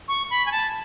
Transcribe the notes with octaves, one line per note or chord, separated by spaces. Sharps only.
C#6
B5
G#5
A5